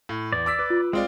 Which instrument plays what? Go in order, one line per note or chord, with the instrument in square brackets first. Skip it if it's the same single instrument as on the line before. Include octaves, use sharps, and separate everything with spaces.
[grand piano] A2
[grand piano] E2 [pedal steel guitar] D5
[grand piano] D6 E6 B6
B4
[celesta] F4
[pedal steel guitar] G#3 [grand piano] C4 F4 D5